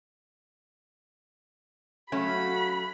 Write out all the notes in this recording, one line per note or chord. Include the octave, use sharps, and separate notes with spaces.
F#3 A3 C#4 F#4 F5 F#5 B5